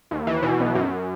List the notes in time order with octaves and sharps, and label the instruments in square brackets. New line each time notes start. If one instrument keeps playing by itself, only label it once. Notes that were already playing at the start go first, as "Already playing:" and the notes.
[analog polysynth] D#2
E3
B2
B1
F#2